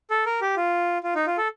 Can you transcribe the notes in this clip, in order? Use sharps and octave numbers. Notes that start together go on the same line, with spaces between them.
A4
A#4
G4
F4
F4
D#4
F4
A4